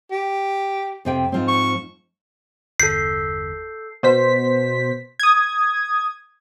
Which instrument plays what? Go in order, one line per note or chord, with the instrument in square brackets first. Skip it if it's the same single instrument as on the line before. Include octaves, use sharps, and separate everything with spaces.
[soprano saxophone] G4
[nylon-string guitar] F2 C3 G5
G#2 F3 C4
[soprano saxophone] C#6
[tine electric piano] G1 E2 B6 [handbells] A4 G6 [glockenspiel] C7
[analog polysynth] B2 C5 B6
D#6 G#6